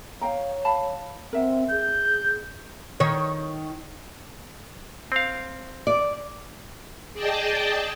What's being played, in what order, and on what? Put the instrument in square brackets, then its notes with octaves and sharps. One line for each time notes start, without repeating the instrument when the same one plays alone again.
[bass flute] C#5 [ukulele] F5 G5 A#5
[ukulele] F5 A5 B5
[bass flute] C4 [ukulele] A#4 E5 F#5
[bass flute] G#4 [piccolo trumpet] G6
[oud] D#3 C#5
[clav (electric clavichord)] C4 F5
[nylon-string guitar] D5
[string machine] G#4 D5 D#5 G5 A5